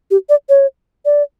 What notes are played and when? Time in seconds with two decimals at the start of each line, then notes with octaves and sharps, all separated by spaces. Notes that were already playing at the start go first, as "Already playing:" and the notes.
0.11 G4
0.29 D5
0.49 C#5
1.05 D5